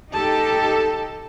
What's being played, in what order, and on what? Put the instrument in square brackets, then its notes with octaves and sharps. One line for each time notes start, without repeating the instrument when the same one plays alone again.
[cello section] D#4 G4 A4 [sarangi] A5